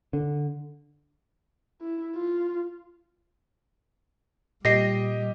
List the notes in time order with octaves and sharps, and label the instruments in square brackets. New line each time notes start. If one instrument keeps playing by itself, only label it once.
[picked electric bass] D3
[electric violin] E4
F4
[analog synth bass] A#2 [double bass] G3 [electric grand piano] G4 D#5 [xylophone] A#6 C7